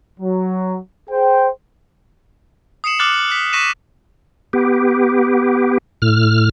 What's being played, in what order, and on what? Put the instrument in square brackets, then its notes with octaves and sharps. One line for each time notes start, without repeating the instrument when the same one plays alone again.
[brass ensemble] F#3
G#4 C5 G5
[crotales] D#6 C7 C#7 E7 F#7
D6 F6 F#6 A6 C#7 F#7
F#6 B6
C#6 F#6 A#6 B6 D#7 E7
[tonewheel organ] B3 G4
A2 F6